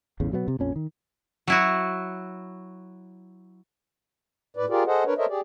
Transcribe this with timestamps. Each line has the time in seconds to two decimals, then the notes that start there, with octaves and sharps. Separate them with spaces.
0.20 A1 E2 A2 C#3
0.32 B2 F#3 G#3 B3
0.48 C3
0.59 A#1 F2 C#4
0.76 D#3
1.47 F#3 E4 F#4
4.57 A2 B4 D5
4.69 F4 G4 G#4 A#4 D5
4.87 G#4 A4 C5 D#5 F#5
5.06 D4 A#4 B4 C#5
5.18 A4 A#4 C5 C#5 D#5 E5
5.29 G4 G#4 D5